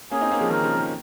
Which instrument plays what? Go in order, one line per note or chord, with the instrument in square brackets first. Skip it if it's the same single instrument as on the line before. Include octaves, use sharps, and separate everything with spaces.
[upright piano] A#3 C#4 [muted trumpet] G#4
[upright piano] C4 D#4
A#3 C#4
F3 G#3
[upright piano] D#3 [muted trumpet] A#4
[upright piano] C#3 F3
D#3